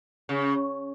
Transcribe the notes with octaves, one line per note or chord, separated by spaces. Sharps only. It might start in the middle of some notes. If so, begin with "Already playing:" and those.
C#3